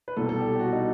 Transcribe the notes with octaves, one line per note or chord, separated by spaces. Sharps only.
B4
C2 B2 G3 A4
A4
G4
G4
F#4
D#4